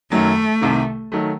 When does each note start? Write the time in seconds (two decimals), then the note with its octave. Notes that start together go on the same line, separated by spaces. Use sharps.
0.11 F#2 D#3 F#3 A3
0.61 C2 C3 D#3
1.12 D#3 F#3 A3